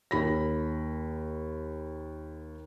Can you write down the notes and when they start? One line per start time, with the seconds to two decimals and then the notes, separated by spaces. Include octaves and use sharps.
0.11 D#2 B5 A#6